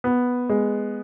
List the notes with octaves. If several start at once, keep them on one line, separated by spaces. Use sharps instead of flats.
B3
G#3